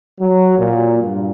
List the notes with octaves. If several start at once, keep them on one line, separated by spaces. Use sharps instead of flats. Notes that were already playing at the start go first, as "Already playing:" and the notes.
F#3
A#2
G2